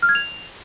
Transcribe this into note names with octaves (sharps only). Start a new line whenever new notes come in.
F6
G#6
F7